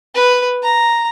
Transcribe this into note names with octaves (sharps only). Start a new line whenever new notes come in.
B4
A#5